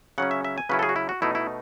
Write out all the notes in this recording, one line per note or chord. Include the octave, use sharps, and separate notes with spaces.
C#3 F#3 C#4 F#5
E5
E5
G#5
C#3 F#3 C#4 E4 B4
A4
G#4
F#4
E4
F#4
B2 A3 D#4 E4
E4